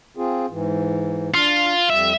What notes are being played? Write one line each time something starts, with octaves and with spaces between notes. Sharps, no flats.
C4 F4 G#4
G#2 E3
D4 F4
F2 G3 E5